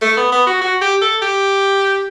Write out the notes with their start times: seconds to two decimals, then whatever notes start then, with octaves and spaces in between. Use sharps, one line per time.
0.02 A3
0.17 B3
0.32 B3
0.47 F#4
0.62 F#4
0.82 G4
1.02 A4
1.22 G4